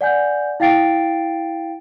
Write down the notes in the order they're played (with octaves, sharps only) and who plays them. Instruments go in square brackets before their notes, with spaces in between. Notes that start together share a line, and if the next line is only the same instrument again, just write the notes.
[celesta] D5 F#5 G#5 G6
E4 F5 G5 A6 C7 D7